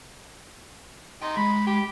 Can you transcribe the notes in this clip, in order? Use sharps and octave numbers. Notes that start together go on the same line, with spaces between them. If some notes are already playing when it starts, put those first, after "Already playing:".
D#4 G4 C6
G#3 B5
G4